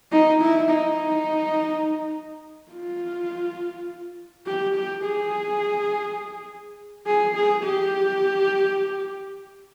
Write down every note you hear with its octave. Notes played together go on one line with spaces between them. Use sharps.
D#4
E4
D#4
F4
G4
G4
G#4
G#4
G#4
G4